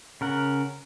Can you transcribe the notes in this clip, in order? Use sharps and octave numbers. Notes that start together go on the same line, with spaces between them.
C#3 A#4 F#5